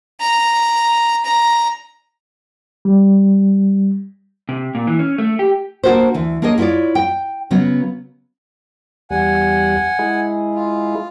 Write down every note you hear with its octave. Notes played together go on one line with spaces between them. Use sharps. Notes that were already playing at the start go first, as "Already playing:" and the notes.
A#5
A#5
G3
C3
A#2
E3
C#4
A3
G4
A#3 D4 F#4 A4 C5
D2 E3
A#3 D4 G#4 C#5 D#5
E4 F4 G#4 C#5 D5
G5
C#3 F#3 B3
E2 G3 F#5 G#5
G#3 E4 G#4
F4